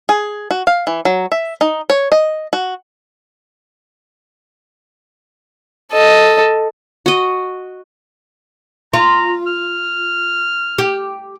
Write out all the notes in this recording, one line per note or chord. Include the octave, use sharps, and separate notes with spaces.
G#4
F#4
F5
E3
F#3
E5
D#4
C#5
D#5
F#4
A4 D#5
F#4 D#5
F4 A#5
F6
G4